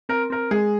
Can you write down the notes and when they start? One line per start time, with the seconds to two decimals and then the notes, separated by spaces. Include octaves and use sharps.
0.09 C4 A#4
0.30 C4 A#4
0.51 G#3 G#4